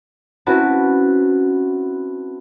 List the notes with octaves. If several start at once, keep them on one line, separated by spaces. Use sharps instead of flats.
C4 C#4 E4 F#4 B4 A5